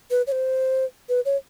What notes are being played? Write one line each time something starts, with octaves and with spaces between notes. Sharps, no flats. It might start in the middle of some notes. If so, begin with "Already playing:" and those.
B4
C#5
C5
B4
C#5